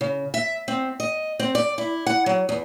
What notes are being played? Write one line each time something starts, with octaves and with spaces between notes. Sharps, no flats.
C#3
E5
C4
D#5
C4
D5
E4
F#5
F#3
E2